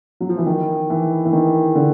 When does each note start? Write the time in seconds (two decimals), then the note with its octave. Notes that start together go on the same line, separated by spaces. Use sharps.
0.20 F#3
0.29 F3
0.38 E3
0.46 D#3
0.90 E3
1.25 E3
1.33 D#3
1.75 D3